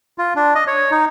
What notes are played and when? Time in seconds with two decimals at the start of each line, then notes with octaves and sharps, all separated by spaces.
0.18 F4
0.36 D4
0.55 D#5
0.67 C#5
0.91 D#4